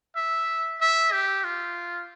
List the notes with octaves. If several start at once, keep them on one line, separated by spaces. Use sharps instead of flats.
E5
E5
G4
F4